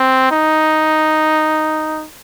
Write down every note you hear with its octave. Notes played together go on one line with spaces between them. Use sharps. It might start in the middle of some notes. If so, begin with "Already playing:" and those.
Already playing: C4
D#4